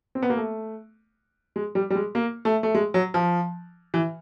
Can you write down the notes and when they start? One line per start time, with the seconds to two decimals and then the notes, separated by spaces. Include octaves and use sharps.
0.15 C4
0.22 B3
0.30 A#3
0.37 A3
1.56 G#3
1.75 G3
1.90 G3
1.96 G#3
2.15 A#3
2.45 A3
2.63 A3
2.75 G#3
2.94 F#3
3.14 F3
3.94 E3